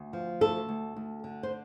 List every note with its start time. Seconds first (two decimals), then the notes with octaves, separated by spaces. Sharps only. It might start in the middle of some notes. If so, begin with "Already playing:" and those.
Already playing: D2
0.13 F3
0.41 D2 A4
0.69 D2
0.97 D2
1.24 D3
1.43 C5